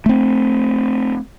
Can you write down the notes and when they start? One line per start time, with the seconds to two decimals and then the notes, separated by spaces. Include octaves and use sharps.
0.06 A3 C4